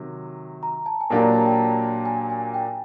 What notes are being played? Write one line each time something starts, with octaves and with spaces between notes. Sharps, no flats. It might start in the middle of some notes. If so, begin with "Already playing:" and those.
Already playing: C3 D#3 F#3
A#5
A5
G#5
A#2 F#3 A#3 D4 G4 A5
A#5
A5
G5
A5
G#5
G#5
G5